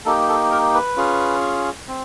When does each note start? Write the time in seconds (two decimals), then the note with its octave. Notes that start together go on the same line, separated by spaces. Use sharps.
0.05 A#3 D#4 G4 A4
0.29 A4
0.51 A#4
0.74 B4
0.97 C#4 F4 G#4
1.88 C4